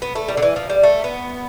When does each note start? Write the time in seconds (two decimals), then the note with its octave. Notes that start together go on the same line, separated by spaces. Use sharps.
0.02 B3
0.15 A3
0.28 G3
0.37 D3
0.42 E3
0.56 F3
0.70 G3
0.83 A3
1.04 B3